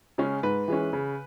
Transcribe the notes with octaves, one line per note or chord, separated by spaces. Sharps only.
C#3 G#3 C#4
G#2 B4
E3 G#3 C#4
C#3